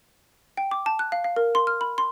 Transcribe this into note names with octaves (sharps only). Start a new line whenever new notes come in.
G5
D6
A5
F#6
F5
F5
A#4
C6
F6
B5
C6